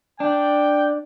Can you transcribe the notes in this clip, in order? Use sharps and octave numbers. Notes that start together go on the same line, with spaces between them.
D4 G5